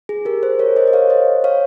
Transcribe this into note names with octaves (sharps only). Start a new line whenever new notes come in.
G#4
G4 A#4
G#4 C5
A#4 C#5
C5 D#5
D#5
C#5 F5
C5 D#5
C#5 F5